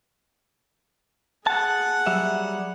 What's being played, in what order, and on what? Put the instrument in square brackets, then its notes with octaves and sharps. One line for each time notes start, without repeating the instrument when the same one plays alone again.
[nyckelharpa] G#4 F#5 [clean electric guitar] A5
[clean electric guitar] F#3 G3 E5